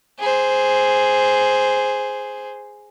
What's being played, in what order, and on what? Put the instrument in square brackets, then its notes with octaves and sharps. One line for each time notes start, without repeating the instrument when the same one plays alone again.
[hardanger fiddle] G#4 C5